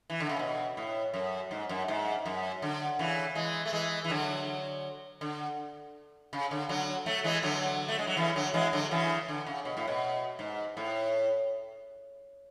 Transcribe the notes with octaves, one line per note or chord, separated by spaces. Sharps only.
E3
D3
C#3
B2
A2
F#2
G#2
F#2
G#2
F#2
D3
C#3 E3
E3 G#3
A3
E3 G#3
E3
D3 F#3
D3
C#3
D3
D3 F#3
F#3 A3
E3 G#3
D3 F#3
A3
G#3
F#3
C#3 E3
D3 F#3
E3 G#3
D3 F#3
C#3 E3
D3
C#3
B2
A2
B2
G#2
A2